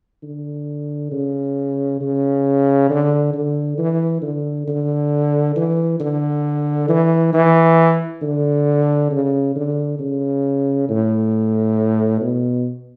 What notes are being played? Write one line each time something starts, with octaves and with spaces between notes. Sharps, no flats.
D3
C#3
C#3
D3
D3
E3
D3
D3
E3
D3
E3
E3
D3
C#3
D3
C#3
A2
B2